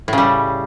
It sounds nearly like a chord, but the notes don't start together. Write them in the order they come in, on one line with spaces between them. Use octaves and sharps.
A2 C#3 G3